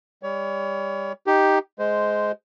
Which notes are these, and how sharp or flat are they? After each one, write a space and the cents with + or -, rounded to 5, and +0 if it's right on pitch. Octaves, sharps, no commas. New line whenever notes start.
G3 +30 C#5 +30
D#4 +0 G4 +0
G#3 +10 C5 -10